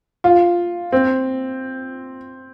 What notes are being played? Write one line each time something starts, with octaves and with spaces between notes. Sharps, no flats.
F4
C4